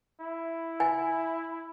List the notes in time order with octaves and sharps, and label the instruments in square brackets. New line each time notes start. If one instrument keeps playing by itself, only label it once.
[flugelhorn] E4
[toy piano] G#5